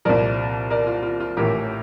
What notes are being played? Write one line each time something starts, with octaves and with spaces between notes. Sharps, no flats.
C2 A#2 F3 A#4 D5
A#4 D5
F4
F4
F4
A1 A2 E3 G4 A#4